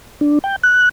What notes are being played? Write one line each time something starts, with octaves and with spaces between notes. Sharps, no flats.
D4
G5
F#6